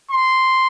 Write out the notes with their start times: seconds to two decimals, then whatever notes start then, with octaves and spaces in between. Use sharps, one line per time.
0.12 C6